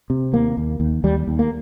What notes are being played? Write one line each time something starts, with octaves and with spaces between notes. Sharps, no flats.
C3
D#2 A#3
D#2
D#2
D#2 G3
D#2
A#3